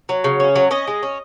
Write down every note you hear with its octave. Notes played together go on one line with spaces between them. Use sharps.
F#3
C#3
C#4
F#3
C#4 D#5
G#3
C#4